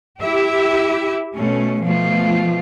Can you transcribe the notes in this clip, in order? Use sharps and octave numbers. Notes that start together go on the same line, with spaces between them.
E4 G4 E5
B2 A3 C#4
B2 F3 A3 F4